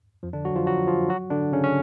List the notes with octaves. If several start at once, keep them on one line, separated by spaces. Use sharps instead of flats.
F2 F3
D3 D4
F#3 F#4
F3 F4
F#3 F#4
F3 F4
F#3 F#4
D3 D4
C#3 C#4
C#4